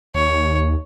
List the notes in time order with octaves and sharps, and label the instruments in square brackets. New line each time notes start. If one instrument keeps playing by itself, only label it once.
[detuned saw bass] D#2 [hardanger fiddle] C#5